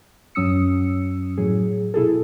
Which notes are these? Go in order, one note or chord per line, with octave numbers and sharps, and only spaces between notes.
F#2 F#3 C#4 D#6 E6 C#7
A2 F#3 G#4
B2 E4 G#4 A4